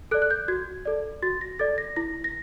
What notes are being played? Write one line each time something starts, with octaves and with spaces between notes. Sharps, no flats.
A4 D5 F#6
F#6
G6
F#4 G#6
A4 D5
F#4 A6
A#6
A4 D5 A6
A#6
E4 A#6
A#6